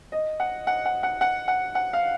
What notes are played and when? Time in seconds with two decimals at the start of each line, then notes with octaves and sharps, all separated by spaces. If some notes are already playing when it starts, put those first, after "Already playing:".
0.12 D#5
0.40 F#5
0.67 F#5
0.85 F#5
1.03 F#5
1.21 F#5
1.48 F#5
1.75 F#5
1.93 F5